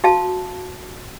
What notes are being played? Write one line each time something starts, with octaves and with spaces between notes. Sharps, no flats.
F#4 F5 A5